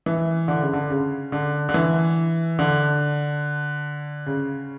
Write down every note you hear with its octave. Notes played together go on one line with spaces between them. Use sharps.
E3
D3
C#3
D3
C#3
D3
D3
E3
D3
C#3